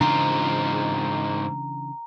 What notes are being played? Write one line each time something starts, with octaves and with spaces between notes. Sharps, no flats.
G#2 C#3 E3 C4 D4 F4 A#5